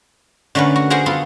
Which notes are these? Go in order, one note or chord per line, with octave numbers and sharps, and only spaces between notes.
D3 A3 C#4 A#4 B4
F#4
G#4 A#4 C5 F#5 G#5
B3 F4 A4